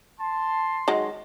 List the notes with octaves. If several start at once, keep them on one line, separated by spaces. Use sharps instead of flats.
A5 C6
D#3 F#3 G#3